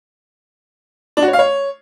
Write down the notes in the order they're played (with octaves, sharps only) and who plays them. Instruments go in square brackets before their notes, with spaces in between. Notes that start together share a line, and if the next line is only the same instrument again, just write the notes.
[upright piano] D4
F#4
C#5
F5
C#5